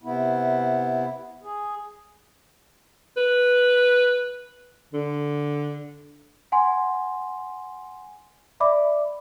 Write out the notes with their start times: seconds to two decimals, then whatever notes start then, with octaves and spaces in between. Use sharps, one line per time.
0.03 C3 B3 E4
1.43 G#4
3.17 B4
4.93 D3
6.52 F#5 G#5 C6
8.60 D5 E5 B5 D6